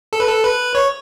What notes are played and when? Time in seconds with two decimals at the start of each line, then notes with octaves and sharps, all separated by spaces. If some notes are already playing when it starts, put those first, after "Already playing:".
0.13 A4
0.20 B4
0.27 A4
0.44 B4
0.75 C#5